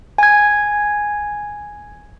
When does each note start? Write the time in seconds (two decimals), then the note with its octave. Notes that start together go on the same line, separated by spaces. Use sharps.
0.18 G#5 G#6